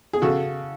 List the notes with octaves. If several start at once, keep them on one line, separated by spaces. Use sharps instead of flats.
G#4
C#3 F#4 A4